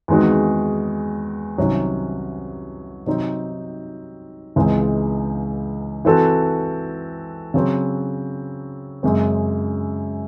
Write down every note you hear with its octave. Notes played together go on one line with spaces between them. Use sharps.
E2 D#3 G#3 C4 F#4
C2 C3 D#3 F#3 C#4
C3 F#3 C4 D#4
C#2 C#3 E3 G#3 C4
E3 C4 F#4 A4
C#3 F#3 C4
F#2 C#3 G#3 C4